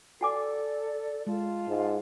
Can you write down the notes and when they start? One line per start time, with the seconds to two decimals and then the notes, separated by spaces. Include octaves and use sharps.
0.21 F#4 A4 D5 G#5 D6
1.27 G#3 F4 A5
1.68 G#2